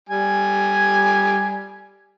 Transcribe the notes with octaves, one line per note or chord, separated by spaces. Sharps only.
G3 G#5